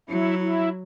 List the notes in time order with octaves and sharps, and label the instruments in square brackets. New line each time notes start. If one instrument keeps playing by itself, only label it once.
[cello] F#3 [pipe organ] E4
[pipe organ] E4